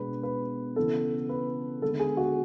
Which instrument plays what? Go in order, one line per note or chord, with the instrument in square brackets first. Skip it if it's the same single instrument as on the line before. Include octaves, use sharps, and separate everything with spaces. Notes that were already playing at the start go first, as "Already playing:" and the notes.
Already playing: [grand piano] B2 G#3 B3 D4 B4
B4
C#3 E3 B3 A4
B4
D3 G#3 B3 A4
G#4
F#4